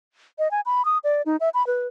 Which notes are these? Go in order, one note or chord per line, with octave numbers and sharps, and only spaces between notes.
D#5
G#5
B5
D#6
D5
D#4
E5
B5
B4